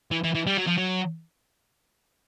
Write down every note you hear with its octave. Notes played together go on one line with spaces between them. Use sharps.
E3
E3
E3
G3
F#3
F3
F#3